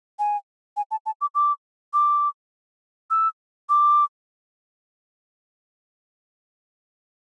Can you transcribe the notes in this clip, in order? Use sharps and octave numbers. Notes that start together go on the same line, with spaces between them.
G#5
G#5
A5
A5
D6
D6
D6
E6
D6